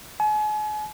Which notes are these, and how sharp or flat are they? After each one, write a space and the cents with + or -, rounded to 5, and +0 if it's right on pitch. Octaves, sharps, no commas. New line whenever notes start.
G#5 +40